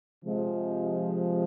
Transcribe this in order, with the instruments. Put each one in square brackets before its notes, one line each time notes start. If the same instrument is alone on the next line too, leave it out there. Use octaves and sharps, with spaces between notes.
[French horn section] C3 F3 G#3